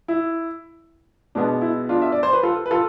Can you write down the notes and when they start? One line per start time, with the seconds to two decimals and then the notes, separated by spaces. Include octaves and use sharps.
0.08 E4
1.35 B2 G#3 B3 D4
1.61 E4
1.89 D4 F4
2.02 E5
2.12 D5
2.23 C5
2.33 B4
2.43 F4 A4
2.66 B4
2.71 F4 A4